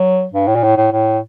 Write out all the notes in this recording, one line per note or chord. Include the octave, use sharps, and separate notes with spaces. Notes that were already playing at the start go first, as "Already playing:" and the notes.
Already playing: F#3
G2
A2
A#2
A2
A2
A2